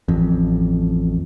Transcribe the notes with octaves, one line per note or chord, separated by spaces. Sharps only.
A1 F2